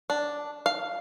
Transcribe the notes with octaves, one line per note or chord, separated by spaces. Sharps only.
D4
F5